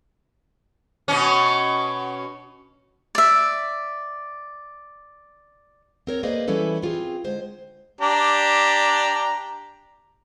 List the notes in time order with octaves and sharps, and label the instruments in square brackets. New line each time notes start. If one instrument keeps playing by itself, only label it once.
[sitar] B2 C#4
[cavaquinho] D5 E5
[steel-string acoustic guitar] C4 A#4 C#5
A#3 G#4 B4 C5 D5 D#5
E3 G3 C#4 E4 A4 B4
C4 F4 G4 G#4
D3 G#3 C5
[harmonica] D4 G4 A#5